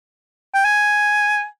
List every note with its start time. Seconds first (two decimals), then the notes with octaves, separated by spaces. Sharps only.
0.54 G5
0.65 G#5